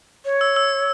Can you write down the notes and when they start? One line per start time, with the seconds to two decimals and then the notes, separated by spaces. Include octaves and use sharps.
0.25 C#5
0.41 E6
0.56 E6